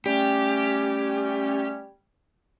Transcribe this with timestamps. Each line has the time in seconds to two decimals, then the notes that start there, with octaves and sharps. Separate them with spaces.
0.06 G3 A3 C#4 G4